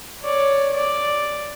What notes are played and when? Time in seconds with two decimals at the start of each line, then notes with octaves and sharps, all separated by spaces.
0.23 C#5 D5
0.76 D5